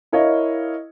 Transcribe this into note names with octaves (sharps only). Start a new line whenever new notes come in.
E4 A#4 C#5 D#5 F5